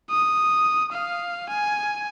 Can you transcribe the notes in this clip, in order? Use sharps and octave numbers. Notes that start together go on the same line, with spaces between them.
D#6
F5
G#5